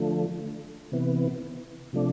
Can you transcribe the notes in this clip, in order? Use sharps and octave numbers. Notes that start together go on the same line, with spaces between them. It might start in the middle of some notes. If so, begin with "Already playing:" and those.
Already playing: D3 F3 A3
C3 E3 B3
C3 F3 A3 D4